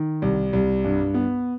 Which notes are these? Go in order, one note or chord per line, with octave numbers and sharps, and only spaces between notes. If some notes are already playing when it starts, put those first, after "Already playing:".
Already playing: D#3
C2
C2
G2
B3